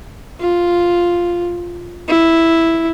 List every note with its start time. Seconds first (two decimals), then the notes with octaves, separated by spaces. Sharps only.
0.40 F4
2.08 E4